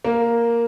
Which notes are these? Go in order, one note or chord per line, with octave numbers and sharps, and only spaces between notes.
A#3